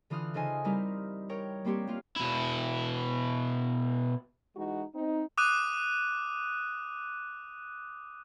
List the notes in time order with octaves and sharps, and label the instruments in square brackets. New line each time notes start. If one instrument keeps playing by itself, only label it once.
[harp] D3 E3 F4 D#6 F6 F#6
C#3 D#4 A4 C5 D#5 G#5
G3 C4 D#4 E4 A#4 F6
A#4 C#5 G5
G3 A#3 C4 G4 C#5
A#3 F4 F5
[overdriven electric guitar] B2 E4
[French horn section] E3 G#3 D#4 F#4
C4 D#4
[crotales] D6 D#6 F#6 D#7